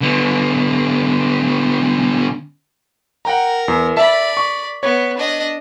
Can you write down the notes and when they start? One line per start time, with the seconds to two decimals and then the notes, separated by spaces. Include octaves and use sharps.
0.01 D3 B3
3.25 A#4 F#5 G5 A#5
3.68 E2
3.97 D5 E5 A5 B5
4.37 C#6
4.83 B3 C#5
5.17 D4 D#5